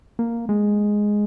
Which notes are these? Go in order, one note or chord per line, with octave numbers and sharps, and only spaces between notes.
A#3
G#3